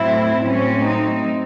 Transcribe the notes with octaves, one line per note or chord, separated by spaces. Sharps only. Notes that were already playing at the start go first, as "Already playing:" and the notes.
Already playing: A2 F#3 C4 E4
A2 F#3 C4 C#4
D#4